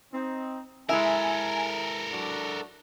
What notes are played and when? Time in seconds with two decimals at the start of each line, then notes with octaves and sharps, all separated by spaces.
0.13 C4 D#4
0.89 G#3 E4 A4 A#4 E5 G#5 A#5
2.12 F#3 D4 F#4